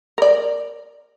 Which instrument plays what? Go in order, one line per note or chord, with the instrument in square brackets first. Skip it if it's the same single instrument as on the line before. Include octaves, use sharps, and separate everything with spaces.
[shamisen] A#4 D5